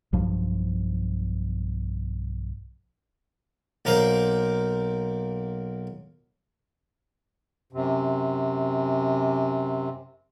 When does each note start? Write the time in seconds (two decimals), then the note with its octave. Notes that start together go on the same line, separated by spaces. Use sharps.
0.13 B1 G2 F3
3.85 B1 A#3 A#4 C5
7.73 F#2 C3